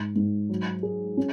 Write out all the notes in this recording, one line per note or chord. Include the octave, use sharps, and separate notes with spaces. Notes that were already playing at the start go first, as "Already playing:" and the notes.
Already playing: G#2
G#2
F#3
G#4
C#4